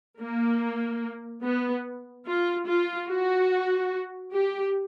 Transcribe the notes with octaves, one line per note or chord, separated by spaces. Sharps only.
A#3
B3
F4
F4
F#4
G4